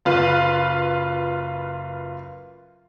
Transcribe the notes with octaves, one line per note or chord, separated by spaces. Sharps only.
F#1 F4 B4